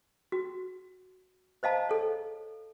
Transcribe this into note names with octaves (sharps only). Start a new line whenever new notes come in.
F#4
C5 D#5 F5 A5 A#5
A4 C#5